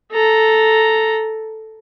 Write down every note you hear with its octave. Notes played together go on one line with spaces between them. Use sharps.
A4 A#5